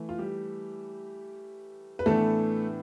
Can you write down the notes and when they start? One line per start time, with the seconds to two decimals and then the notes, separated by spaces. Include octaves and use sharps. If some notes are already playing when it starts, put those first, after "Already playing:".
Already playing: E3 A3
0.09 F4
0.18 G3 G4
1.99 B4
2.06 A2 E3 A3 B3 D4 A4